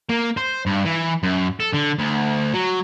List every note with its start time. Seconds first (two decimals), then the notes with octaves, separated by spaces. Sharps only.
0.09 A#3
0.37 C5
0.66 G2
0.85 E3
1.23 F#2
1.60 A4
1.73 D3
1.99 D2
2.53 F#3